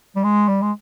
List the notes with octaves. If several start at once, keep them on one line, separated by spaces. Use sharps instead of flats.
G3
G#3
G3
G#3